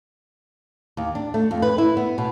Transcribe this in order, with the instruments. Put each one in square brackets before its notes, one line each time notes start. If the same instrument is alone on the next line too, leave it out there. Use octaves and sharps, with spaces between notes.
[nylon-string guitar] D#2
D4
A3
F2
B4
E4
B3
B2